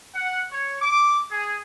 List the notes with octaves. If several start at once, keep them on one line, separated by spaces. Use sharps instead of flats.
F#5
C#5
D6
G#4